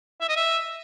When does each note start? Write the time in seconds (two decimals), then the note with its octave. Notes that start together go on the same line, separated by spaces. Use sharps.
0.21 E5
0.29 D#5
0.36 E5